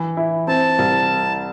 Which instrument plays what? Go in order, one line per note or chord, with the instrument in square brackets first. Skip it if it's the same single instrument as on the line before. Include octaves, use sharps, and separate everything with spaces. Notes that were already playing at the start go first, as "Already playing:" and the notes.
Already playing: [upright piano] E3
E4
[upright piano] C4 [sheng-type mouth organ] A5
[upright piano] C2